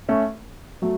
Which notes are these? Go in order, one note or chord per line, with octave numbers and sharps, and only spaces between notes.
A3 C#4
F#3 A3